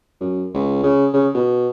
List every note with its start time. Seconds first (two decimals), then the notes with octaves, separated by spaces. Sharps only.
0.21 F#2
0.54 C#2
0.84 C#3
1.14 C#3
1.35 B2